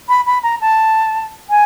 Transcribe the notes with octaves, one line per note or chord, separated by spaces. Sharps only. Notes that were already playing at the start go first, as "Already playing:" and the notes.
B5
B5
A#5
A5
G#5